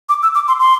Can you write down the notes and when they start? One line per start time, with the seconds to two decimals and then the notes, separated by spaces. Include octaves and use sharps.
0.09 D6
0.23 E6
0.35 D6
0.48 C6
0.60 C6